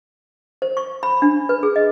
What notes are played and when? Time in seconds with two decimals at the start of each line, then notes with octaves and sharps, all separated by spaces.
0.62 C5
0.77 C#6
1.03 B5
1.22 D4
1.49 B4
1.63 G#4
1.76 D#5